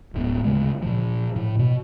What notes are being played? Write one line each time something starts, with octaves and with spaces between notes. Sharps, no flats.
D1 A2 B3
D2 C#3 G#3
A#2 F3
A2
B2